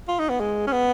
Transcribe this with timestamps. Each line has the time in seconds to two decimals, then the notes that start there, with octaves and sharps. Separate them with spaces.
0.08 F4
0.19 D#4
0.30 B3
0.40 G#3
0.67 C#4
0.72 B3